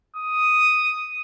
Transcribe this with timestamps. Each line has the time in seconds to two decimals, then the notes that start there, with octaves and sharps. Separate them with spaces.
0.17 D#6